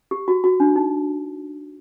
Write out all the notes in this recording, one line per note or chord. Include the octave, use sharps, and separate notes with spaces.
G4
F#4
F#4
D4
D#4